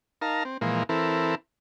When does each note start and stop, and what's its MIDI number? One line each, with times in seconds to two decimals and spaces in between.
0.22 0.44 63
0.22 0.44 70
0.22 0.44 77
0.22 0.44 81
0.22 0.44 82
0.45 0.57 60
0.61 0.83 46
0.61 0.83 52
0.61 0.83 53
0.61 0.83 56
0.61 0.83 58
0.89 1.35 52
0.89 1.35 60
0.89 1.35 64
0.89 1.35 69
0.89 1.35 70